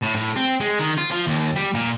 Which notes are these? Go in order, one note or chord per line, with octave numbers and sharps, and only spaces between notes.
A2
A2
C4
G#3
D#3
F4
F3
D#2
G3
A#2